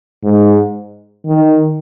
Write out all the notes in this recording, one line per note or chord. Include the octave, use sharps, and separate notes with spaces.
G#2
D#3